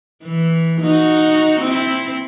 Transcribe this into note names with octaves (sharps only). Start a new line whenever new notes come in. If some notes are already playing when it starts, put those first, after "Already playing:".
E3
D#4 F#4
C4 E4